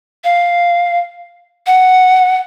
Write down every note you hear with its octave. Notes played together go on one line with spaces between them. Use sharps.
F5
F#5